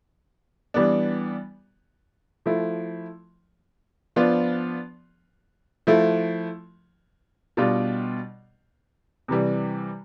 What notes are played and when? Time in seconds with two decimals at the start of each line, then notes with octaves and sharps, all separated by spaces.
0.74 E3 G3 B3 D4
2.46 F3 A3 E4
4.16 F3 B3 D4 F4
5.87 F3 A3 E4
7.57 B2 G3 D4 F4
9.28 C3 E3 G3